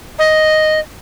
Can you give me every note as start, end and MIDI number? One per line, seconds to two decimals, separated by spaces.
0.18 0.79 75